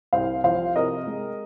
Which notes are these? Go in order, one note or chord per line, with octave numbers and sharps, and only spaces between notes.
C2 C5 F5
F3 C5 F5
C3 A#4 D#5
G#3